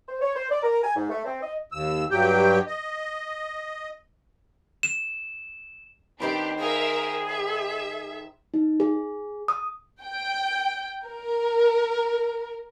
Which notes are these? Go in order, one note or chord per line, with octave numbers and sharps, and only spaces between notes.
C5
C#5
C5
D5
A#4
G#5
G#2
A3
C4
D#5
D#2 E6
G2 F#3 G4 G5
D#5
E7
D#3 C4 D4 G4 C5 B5
G#4 A#4 E5 F5
E5
D#4
G#4
D#6
G5
A#4